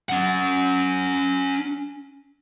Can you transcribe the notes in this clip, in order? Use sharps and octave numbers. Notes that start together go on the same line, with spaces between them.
C#4 F#5